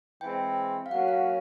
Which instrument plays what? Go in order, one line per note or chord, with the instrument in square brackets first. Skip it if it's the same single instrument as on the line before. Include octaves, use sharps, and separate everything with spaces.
[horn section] E3 G#3 C4 [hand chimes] G5
[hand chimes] F5
[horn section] F#3 A#3 C#4 F#4 [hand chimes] F#5
[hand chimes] F5